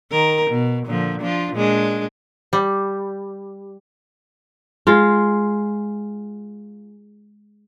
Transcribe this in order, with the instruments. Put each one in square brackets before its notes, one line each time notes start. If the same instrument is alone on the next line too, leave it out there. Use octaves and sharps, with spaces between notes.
[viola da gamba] D#3 A#4
B2
A#2 D3 F3
F3 D4 F4
A#2 G#3 D4
[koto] G3
[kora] G#3 F4